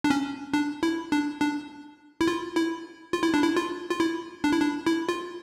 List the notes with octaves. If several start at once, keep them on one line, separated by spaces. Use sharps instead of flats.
D4
C#4
D4
E4
D4
D4
E4
F4
E4
F4
E4
D4
E4
F4
F4
E4
D4
E4
D4
E4
F4